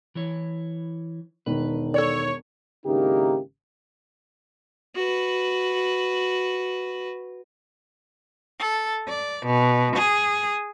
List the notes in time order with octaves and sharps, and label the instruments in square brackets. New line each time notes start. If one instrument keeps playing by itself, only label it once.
[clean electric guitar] E3 E4 C#5
[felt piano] E1 D#3 [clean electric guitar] B4
[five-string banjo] A4 D5 [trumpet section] C#5
[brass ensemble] G#1 C#3 A#3 D#4 E4 G4
[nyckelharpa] F#4 B4
[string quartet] A4
D5
B2
G#4